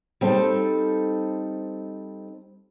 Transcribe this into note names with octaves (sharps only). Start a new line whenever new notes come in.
G3 C4 D#4 A4